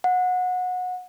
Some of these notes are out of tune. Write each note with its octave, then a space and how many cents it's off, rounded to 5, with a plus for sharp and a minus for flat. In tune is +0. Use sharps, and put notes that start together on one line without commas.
F#5 -25